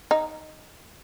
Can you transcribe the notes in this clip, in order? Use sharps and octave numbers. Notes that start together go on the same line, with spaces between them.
D#4